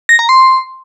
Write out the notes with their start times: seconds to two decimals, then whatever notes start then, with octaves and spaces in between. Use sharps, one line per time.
0.09 A#6
0.19 A#5
0.29 C6